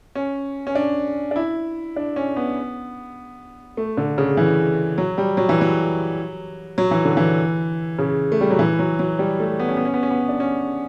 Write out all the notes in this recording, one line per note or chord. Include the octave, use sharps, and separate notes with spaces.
C#4
C#4
D4
D4
E4
D4
C#4
B3
A3
D3
C#3
E3
F#3
G3
F#3
E3
F#3
F#3
E3
D3
E3
C#3
A3
G3
F#3
E3
F#3
F#3
G3
A3
B3
C#4
B3
C#4
B3
C#4
B3
D4
C#4